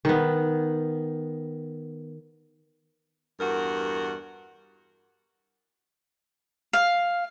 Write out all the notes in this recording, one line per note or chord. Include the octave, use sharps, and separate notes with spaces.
D#3 B3
E2 G2 F#4 A#4
F5